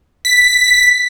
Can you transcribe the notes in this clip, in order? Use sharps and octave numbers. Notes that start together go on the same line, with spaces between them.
B6